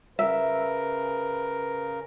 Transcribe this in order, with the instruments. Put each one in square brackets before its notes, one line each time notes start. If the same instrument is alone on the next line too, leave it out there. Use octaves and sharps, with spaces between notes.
[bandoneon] C#3 A#4 [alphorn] B4 [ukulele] E5